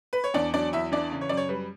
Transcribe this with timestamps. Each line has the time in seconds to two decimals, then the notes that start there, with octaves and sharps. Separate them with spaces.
0.13 B4
0.24 C#5
0.34 E2 D4 D5
0.54 F#3 D4 D5
0.73 E2 E4 E5
0.92 E3 D4 D5
1.12 C#3
1.21 C#5
1.29 F#2 D5
1.37 C#5
1.49 G3 B4